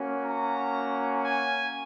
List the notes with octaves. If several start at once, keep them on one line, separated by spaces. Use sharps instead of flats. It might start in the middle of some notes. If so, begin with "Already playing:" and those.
Already playing: A#3 C#4 F#4
A#5
G#5